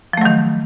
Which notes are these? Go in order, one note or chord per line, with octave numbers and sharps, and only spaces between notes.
D#3 F3 F#3 A3